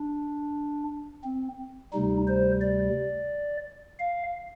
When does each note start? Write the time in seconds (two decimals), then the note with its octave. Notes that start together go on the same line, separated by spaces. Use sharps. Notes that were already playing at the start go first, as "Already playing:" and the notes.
Already playing: D4
1.24 C4
1.93 D2 C3 G3 D#4
2.27 C5
2.61 D5
3.99 F5